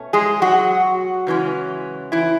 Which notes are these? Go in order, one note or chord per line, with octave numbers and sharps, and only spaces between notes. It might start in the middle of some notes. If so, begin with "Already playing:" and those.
Already playing: B2 A3 C#4
G#3 G#4
F#3 F#4
C#3 E3 G#3 C#4
E3 E4